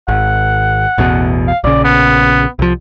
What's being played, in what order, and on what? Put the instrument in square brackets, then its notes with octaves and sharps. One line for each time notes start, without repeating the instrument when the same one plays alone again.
[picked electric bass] G#1 [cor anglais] F#5
[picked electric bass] A1 E2 B2
[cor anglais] F5
[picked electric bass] A#1 C#3 [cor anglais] D5
[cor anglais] B3
[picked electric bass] C2 F3